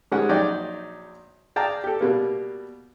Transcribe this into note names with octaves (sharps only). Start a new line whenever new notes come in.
G#2 G3 G#3 C#4 F#5
A#1 F#3 D#4 D5 G5
G#4 D5 F5 G5 A5 A#5
G4 A4
B2 G3 A#3